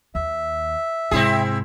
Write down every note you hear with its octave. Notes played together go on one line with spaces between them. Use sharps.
D#2 E5
G#2 C3 C4 E4 G#4